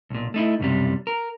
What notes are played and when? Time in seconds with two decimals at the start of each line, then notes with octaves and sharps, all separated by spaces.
0.10 B1 A#2
0.34 A3 D#4 E4
0.59 B1 F#2 C3 G3
1.07 A#4